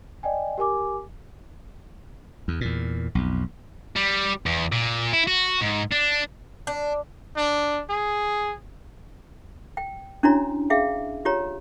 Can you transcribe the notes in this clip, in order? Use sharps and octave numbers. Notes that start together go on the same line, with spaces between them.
D5 D#5 G5 G#5
G4 A#4 G#5 D6
E2
E2 A#2
B1 F2
G3
E2
A#2
E4
F#4
G#2
D4
D4
D4
G#4
G5
C#4 D4 E4 F#4 C#5 A#5
G#4 E5 F5 G5
F4 G4 C#5 A#5